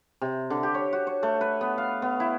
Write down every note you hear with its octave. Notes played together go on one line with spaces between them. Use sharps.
C3
D3
G4
C#5
F#4
C#5
A3
B4
B3
F5
B3
E4